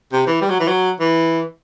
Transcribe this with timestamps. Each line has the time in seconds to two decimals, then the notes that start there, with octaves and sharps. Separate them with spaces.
0.12 C3
0.27 E3
0.42 G3
0.50 F#3
0.60 E3
0.68 F#3
1.00 E3